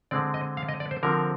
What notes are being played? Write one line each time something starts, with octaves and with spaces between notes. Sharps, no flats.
D3 G#3 C4 D5
D#5
F5
D#5
D5
C5
D3 F3 C4 A#4